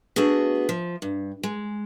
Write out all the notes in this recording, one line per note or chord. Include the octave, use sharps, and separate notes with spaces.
A3 B3 D4 F#4 G#4
F3
G2
G#3